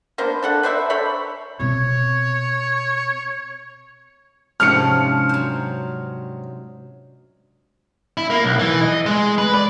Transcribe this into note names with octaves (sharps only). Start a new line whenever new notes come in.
A#3 B3 D4 C5
D4 A4 F#5
B4 C5 D5 E5
A4 C5 C#5 B5
B2 C4 C#5
G#2 C3 F3 C#4 D4 F6 C#7
F#3 C5
E4
A#3
B1
E3
D#5
G#3
B4
D5